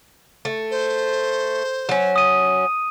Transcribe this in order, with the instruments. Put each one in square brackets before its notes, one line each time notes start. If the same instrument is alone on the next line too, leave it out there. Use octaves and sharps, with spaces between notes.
[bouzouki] A3
[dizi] C5
[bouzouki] F#3 C#4
[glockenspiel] D#6 D#7